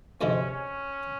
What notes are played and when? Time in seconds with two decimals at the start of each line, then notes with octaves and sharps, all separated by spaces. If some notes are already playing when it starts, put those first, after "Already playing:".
0.21 D2 C3 F3 G#3 C4 C#4
0.50 C#4